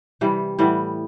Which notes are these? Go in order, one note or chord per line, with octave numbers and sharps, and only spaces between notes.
C3 E3 G3
A2 E3 G3 B3